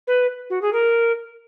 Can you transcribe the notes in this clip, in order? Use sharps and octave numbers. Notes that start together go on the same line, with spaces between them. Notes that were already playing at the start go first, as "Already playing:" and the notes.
B4
F#4
G#4
A#4